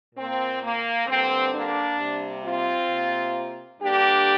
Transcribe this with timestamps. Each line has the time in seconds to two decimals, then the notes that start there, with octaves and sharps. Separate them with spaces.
0.15 A#2 A#3 C4
0.62 A#3
1.07 G2 D3 A#3 C4
1.53 A#3 D4
1.98 C3 G3 A#3
2.44 C4 F4
2.90 C3 A#3
3.80 G2 D3 A#3 D4 G4